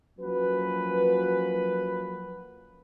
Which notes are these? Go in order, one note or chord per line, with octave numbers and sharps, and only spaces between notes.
F3 F#3 A#3 C#4 F#4 B4